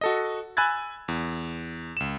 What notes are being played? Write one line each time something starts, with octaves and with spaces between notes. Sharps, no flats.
F#4 A4 D#5
G#5 B5 E6 F#6 G#6 A6
E2
C#2 E7